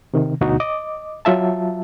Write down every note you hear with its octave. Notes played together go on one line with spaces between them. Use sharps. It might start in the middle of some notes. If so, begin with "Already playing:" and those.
C3 D#3
D2 B2 D#4 F#4
D#5 D6
F#3 F4 E5 A5